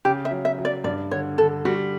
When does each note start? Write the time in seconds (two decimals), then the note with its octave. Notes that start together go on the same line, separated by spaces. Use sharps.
0.05 C#3 G4
0.25 E5
0.31 F#3
0.45 E5
0.59 F#3
0.65 D5
0.84 G2 D5
1.11 D3 C#5
1.38 D3 A4
1.65 G3 F#4